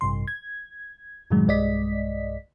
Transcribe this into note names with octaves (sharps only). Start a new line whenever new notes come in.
A1 G2 C3 C6
G#6
F#2 A2 C3 D#3 F#3 G#3
B1 G2 G#3 D5 D#5 B6